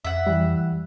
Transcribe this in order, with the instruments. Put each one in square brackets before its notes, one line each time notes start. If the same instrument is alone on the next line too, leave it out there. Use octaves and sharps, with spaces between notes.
[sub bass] F2 [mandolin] E5 F#5
[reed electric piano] E3 G3